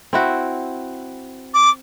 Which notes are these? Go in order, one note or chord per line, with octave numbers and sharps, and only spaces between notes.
C4 E4 F#4
D6